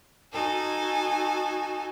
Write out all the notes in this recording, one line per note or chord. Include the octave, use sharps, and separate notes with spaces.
D#4 F#4 A4 G#5